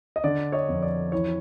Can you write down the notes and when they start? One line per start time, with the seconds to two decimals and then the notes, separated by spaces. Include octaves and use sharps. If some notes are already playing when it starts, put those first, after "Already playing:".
0.16 D#5
0.24 D3 D5
0.52 C#5 D#5
0.68 F2
0.83 D5
1.12 E3 C#5